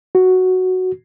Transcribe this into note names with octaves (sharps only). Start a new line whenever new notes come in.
F#4